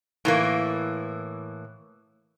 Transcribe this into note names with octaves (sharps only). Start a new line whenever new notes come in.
A2 E3 A#3